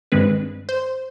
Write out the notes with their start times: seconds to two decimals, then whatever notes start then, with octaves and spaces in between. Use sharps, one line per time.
0.12 G2 D#3 G#3 C4 B4
0.69 C5